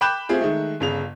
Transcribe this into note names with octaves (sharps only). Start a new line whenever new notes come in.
G5 B5 D6 F#6 G6 E7
A3 C4 F4 G4 G#4
D#3 G#3 A3
G1 C#3 F7